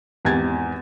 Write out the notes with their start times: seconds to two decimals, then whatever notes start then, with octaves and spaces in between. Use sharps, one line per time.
0.25 G#1 E2 G4 G#6 A6